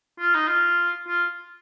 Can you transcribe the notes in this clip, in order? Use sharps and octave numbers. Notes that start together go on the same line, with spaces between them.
F4
D#4
F4
F4